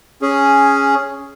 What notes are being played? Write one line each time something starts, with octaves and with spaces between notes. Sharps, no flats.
C#4 G#4